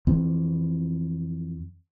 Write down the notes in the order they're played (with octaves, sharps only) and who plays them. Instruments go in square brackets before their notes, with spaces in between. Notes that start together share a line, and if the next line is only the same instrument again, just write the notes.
[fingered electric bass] F2 E3 C4